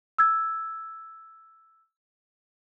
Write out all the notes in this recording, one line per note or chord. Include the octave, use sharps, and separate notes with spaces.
E6 G#6